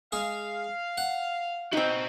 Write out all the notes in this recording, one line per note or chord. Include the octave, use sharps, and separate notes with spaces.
G#3 G#4 F5
F#5
C4 D#4 F#4 D#5